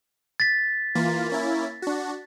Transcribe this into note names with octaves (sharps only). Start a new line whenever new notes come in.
A6 B6
E3 A#3 F4
A#3 C#4 E4
D4 F#4